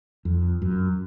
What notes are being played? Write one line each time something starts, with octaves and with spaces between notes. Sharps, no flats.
F2
F#2